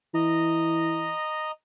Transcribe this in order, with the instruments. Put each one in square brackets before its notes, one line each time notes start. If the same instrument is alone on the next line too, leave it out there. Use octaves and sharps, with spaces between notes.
[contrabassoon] E3 [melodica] D#5 A#5